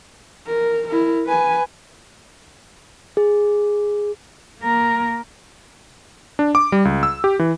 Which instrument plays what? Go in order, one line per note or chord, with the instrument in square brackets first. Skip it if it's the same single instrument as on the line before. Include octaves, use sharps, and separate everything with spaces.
[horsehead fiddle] A#4
E4 A#4
B4 G#5
[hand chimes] G#4
[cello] A#3 A#4
[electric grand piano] D4
D6
G3
C#2
E6
G4
E3